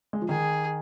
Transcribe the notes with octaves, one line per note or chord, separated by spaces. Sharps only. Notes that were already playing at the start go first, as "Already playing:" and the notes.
G#3
F3
D#3 G#4